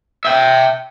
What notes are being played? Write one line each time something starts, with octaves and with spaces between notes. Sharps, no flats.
E5 G5